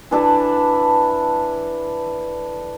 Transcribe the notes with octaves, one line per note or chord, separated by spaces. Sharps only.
E3 D4 A4 B4